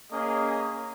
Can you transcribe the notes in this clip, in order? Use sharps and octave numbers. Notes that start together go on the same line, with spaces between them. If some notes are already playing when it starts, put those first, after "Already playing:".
A#3 C#4 G#4 D#5